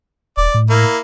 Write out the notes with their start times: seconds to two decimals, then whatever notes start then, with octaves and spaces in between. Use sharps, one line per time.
0.37 D#1 D5
0.54 A2
0.70 A#3 E4